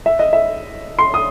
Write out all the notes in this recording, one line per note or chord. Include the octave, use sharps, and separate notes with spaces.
E5
D#5
E5
C6
D#6